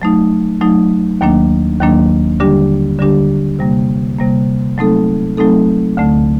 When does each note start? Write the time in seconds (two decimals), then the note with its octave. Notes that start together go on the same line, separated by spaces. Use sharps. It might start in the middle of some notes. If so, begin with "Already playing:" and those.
0.02 F#3 A3 D#4
0.61 F#3 A3 D#4
1.21 D#2 D#3 F#3 A#3 D4
1.80 D#2 D#3 F#3 A#3 D4
2.40 D3 G3 D4 G4
2.99 D3 G3 D4 G4
3.59 C3 G3 A#3
4.18 C3 G3 A#3
4.78 F#3 A3 C4 D#4 A4
5.37 F#3 A3 C4 D#4 A4
5.97 D2 D3 A3